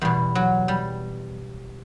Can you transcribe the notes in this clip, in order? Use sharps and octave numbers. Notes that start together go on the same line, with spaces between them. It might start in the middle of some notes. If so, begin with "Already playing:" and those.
E2 B2 G3
F#3
G3